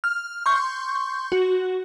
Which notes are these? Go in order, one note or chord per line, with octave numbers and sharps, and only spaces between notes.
F6
C6 C#6 G6
F#4